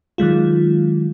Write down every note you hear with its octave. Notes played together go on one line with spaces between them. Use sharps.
D#3 F#3 G#3 F4